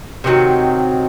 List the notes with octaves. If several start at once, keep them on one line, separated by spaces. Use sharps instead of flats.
C3 D#3 F#3 C4